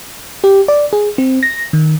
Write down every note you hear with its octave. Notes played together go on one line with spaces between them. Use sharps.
G4
D5
G#4
C4
A#6
D#3